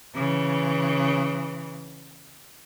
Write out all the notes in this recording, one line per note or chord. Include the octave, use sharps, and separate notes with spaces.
C#3 E3